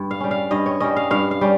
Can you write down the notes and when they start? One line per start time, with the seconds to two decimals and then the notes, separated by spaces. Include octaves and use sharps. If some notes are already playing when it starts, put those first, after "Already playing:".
Already playing: G2
0.11 F5
0.20 G3 C#4
0.31 F5
0.51 G2 D#5
0.66 C#5
0.80 G3 C#4 D#5
0.96 F5
1.11 G2 F5
1.31 F5
1.41 G3 C#4